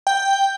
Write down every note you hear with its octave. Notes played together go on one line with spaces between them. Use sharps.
G5